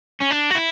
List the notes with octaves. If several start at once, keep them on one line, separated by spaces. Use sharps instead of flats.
C#4
D4
F#4
E4